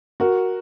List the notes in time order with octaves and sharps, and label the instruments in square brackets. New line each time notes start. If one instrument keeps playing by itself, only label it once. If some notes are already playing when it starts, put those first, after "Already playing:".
[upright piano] F#4 A#4